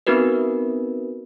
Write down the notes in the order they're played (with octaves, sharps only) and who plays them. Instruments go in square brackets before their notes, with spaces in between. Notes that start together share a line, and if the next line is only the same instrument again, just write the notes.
[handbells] B3 C4 D#4 F#4 A#4 B4